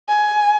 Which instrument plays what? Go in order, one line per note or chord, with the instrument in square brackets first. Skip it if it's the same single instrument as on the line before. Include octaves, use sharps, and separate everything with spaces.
[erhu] G#5